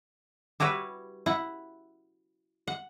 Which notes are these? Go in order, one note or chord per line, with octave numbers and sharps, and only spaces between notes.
G3 E4 F#4 B4 C#5
E4 F#5
F#5